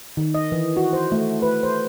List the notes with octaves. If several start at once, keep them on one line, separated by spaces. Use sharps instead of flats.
D#3
D#5
E3
F#4
C5
A3
B4
C5